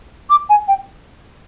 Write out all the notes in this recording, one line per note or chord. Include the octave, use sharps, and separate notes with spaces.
D6
G#5
G5